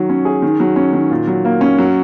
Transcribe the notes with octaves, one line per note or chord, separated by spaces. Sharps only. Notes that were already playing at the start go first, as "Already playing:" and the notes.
Already playing: D#3 F#3
C#4
G#4
D#3
F#3
C#4
D#3
A#2
F#3
A#3
C#4
F#3